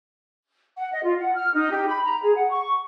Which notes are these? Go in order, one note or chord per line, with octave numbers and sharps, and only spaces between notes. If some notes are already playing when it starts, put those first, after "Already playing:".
F#5
D#5
F4
F#5
F6
D#4
G4
B5
A#5
G#4
F#5
C#6